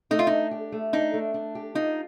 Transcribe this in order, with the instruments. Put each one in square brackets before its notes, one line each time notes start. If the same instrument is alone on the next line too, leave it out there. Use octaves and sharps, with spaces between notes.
[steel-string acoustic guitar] A3 [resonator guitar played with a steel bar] D#4
[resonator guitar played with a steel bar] F4
[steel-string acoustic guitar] D4 [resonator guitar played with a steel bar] D#4
[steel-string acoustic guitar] G4
A3
[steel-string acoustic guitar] D4 [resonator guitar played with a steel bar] D#4
[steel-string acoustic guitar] A3
D4
G4
[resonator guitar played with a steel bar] D#4 [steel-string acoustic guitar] F4